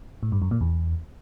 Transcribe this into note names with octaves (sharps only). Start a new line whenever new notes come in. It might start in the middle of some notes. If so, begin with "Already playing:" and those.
A2
G2
F#2
A#2
E2